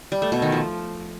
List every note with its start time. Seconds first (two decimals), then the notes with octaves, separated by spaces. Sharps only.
0.12 G3
0.22 A3
0.32 B2
0.42 D#3
0.52 F3